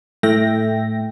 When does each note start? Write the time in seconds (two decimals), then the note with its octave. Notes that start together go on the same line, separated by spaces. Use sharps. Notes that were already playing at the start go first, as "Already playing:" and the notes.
0.23 A2 A3 E5 G5 A#6